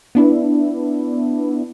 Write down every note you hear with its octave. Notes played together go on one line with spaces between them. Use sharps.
B3 D4 E4